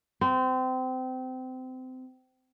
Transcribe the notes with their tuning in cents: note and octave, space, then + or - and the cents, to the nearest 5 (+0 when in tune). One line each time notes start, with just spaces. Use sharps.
C4 -25